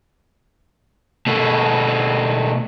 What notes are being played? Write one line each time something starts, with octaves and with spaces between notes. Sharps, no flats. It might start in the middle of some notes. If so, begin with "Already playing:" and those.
B2 A3